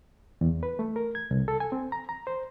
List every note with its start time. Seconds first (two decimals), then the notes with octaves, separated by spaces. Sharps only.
0.41 E2
0.63 B4
0.79 A3
0.96 A#4
1.15 G#6
1.31 C2
1.48 A4
1.60 G#5
1.72 C4
1.92 A#5
2.09 A#5
2.27 C5